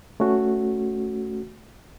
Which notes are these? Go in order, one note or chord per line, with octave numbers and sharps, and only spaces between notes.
A3 C#4 F#4